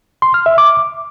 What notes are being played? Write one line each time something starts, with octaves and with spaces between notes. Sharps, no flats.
C6
F6
E5
D6